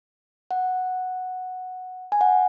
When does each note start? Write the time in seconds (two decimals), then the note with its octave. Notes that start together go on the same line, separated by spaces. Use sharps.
0.51 F#5
2.12 G#5
2.21 F#5